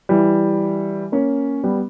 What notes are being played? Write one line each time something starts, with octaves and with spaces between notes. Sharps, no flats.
E3 G3
A#3 C#4
G3 B3